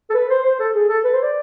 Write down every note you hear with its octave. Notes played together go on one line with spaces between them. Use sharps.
A4
B4
C5
C5
A4
G#4
A4
B4
C5
D5